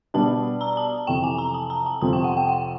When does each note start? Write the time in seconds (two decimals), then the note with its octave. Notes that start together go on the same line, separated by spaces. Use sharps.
0.14 B2 G3 B3 D4 A5
0.61 A#5
0.77 A5
1.07 F2 C3 E3 G5
1.24 G#5
1.38 A#5
1.54 A5
1.70 A#5
1.86 A5
2.01 F2 C3 F3 A5
2.13 G5
2.24 F#5
2.37 G5
2.49 F#5